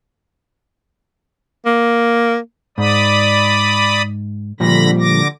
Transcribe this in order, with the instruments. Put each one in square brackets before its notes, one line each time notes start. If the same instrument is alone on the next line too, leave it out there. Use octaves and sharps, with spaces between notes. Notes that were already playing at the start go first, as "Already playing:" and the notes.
[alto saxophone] A#3
[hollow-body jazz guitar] G#2 [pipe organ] D5 B5 D#6
[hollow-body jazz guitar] A#2 F3 G3 [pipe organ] D3 B5 A#6
[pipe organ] D3 D6 A#6